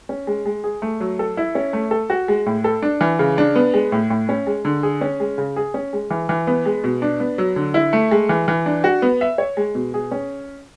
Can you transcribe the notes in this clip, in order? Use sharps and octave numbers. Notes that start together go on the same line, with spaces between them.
C#4
G#3
G#3
G#4
A3
F#3
A4
E4
C#4
A3
A4
F#4
G#3
A2
A4
D4
E3
C#3
D4
B3
G#3
A2
A2
C#4
G#3
D3
G#4
C#4
G#3
C#3
G#4
C#4
G#3
E3
E3
B3
G#3
B2
D4
B3
F#3
D3
E4
A3
G#3
E3
E3
D4
F#4
B3
E5
C#5
G#3
B2
G#4
C#4